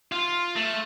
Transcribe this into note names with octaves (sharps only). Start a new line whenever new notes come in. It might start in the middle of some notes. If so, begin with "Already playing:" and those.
F4
A3